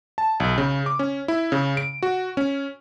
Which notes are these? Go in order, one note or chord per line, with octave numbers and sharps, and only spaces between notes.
A5
B1
C#3
D6
C#4
E4
C#3
D7
F#4
C#4